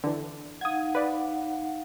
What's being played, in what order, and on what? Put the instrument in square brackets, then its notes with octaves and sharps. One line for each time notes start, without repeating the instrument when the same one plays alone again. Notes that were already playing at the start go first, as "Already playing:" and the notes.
[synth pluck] D3 E3
[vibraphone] D#4 F5 F#5 [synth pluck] D#6 G#6
[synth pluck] B4 D5